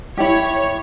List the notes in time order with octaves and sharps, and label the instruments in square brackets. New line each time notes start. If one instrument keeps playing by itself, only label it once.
[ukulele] E4 G4 [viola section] C#5